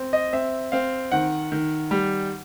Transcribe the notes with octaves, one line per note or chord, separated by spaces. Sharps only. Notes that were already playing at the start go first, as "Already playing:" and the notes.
Already playing: C4
D#5
C4 E5
C4 F5
D#3 F#5
D#3
G3